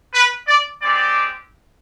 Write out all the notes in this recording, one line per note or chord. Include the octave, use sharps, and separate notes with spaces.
B4
D5
G#3 C4 G4 D5